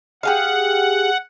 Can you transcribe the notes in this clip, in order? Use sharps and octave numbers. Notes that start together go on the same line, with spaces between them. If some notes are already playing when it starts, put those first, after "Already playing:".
G4 G#4 F5 F#5